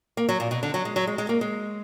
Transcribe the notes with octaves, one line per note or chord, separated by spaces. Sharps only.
A#3
F#3
A#2
B2
D3
F#3
G#3
F#3
G#3
G#3
A#3
G#3